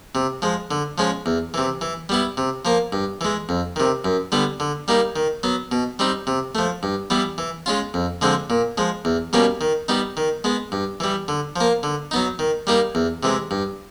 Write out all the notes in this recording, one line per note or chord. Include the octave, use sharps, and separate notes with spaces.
C3
F3 G#3
D3
F3 G#3 C#4
E2
C3 E3
E3
G3 B3 E4
C3
F3 A#3
G2
E3 G#3
F2
C3 D#3
F#2
D3 G3 B3
D3
G3 A#3 D#4
D#3
F#3 B3
B2
G3 C4 D#4
C3
F3 A3
G2
E3 G3 B3
E3
G#3 C#4 F4
F2
D3 F3 G#3 C4
A#2
F3 G#3
E2
B2 G3 A#3 C#4
D#3
G3 B3 D#4
D#3
G#3 B3
G2
E3 G3
D3
F3 A#3
D3
F#3 B3 D#4
D#3
G3 A#3 D#4
E2
C3 E3 G#3
G2